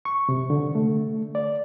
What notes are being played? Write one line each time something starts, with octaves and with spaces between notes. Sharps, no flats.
C#6
C3
D3
A3
D5